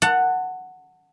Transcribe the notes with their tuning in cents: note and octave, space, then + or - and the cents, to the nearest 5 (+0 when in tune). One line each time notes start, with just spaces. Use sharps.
F#5 +0 A5 +30